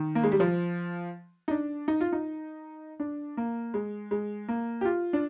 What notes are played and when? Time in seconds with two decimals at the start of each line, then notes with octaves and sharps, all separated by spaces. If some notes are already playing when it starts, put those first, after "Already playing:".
Already playing: D#3
0.15 A#3
0.23 G#3
0.32 G3
0.40 F3
1.48 D#4
1.51 D4
1.88 D#4
2.01 F4
2.12 D#4
3.00 D4
3.37 A#3
3.74 G#3
4.11 G#3
4.48 A#3
4.81 G4
4.85 F4
5.13 D4